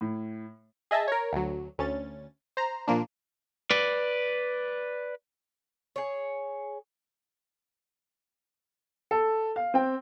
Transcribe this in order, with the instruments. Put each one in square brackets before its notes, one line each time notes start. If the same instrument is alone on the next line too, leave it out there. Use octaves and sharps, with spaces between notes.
[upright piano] A2
[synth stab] G#4 D#5 E5 A5
A#4 C#5
D2 F#3
D2 C#4 A6
C5 A#5
A#2 F3 A#3 D4
[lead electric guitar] B4 D5
[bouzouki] G#4 C#5
[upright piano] A4
F5
C4 G5